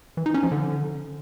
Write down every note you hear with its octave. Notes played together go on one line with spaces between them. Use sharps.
E3
D#4
C#4
F3
D3